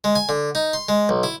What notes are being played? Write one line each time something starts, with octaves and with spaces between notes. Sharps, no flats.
G#3
G#5
D3
D#4
C6
G#3
B1
E4